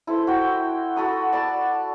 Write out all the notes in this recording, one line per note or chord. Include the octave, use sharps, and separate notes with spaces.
E4 A4 C5
F#4 G5
F#4 A4 B5 D#6
D5 A5 B5